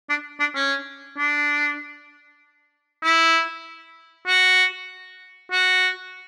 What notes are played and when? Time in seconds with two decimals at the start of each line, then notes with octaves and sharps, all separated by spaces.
0.09 D4
0.40 D4
0.55 C#4
1.18 D4
3.03 E4
4.27 F#4
5.52 F#4